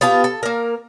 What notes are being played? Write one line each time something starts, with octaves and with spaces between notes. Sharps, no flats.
B3 F4 G4 A5
A4
A#3 A#4